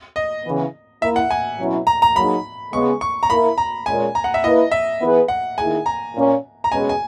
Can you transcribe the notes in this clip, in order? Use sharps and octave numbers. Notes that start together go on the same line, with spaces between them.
D#5
C#3 E3 B3
A#3 E4 A#4 E5
F#5
G#5
B2 F#3 C#4 E4
A#5
A#5
F#3 A#3 D#4 G#4 B5
C#3 G#3 B3 C#6
C#6
A#5
A#3 E4 A#4 B5
A#5
A#2 G#3 C#4 G#5
A#5
F#5
E5
A#3 E4 B4 D#5
E5
E3 B3 E4 G#4 B4
F#5
D#3 A#3 E4 G#4 G#5
A#5
A#2 A#3 C#4
A#5
B2 G#3 C#4 G#4 B4 G#5
G#5